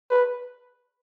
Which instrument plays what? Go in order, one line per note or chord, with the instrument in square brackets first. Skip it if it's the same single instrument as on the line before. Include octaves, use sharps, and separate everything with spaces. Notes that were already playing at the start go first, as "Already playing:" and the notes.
[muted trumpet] B4